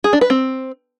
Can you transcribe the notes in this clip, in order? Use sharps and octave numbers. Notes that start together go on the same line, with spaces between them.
G#4
D4
B4
C4